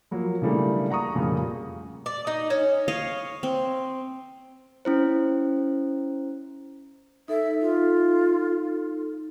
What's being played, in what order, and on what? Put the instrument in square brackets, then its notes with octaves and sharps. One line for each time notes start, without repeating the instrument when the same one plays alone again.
[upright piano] F3 F#3 A#3
C#3 E3 G3 A3 A#3 D4
F#5 A#5 C#6 D#6
A1 F2 A#2 C#3 G3
[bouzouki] D5
D#4
C#4
[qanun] C#5 D#5 F5
C4
[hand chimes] C#4 E4 C5
[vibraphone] D#4 A4 [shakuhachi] E5
[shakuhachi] F4